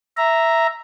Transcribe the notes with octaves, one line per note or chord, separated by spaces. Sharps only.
E5 A#5